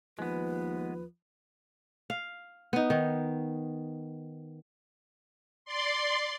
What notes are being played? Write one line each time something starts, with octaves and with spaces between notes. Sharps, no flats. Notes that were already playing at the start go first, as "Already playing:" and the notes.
D#2 F3 G#3 B3 B4
F5
B3 D#4
D#3
D5 C6